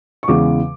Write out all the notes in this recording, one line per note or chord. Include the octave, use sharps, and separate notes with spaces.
C#6
E2 C#3 E3 G#3 D6